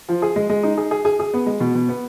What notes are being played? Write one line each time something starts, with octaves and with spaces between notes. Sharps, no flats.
F3
G#4
G#3
G#3
D#4
G#4
G#4
G#4
G#4
B3
G#3
B2
B2
B3